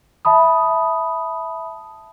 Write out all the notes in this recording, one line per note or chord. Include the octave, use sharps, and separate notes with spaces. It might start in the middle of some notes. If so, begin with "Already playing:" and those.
E5 A5 B5 D#6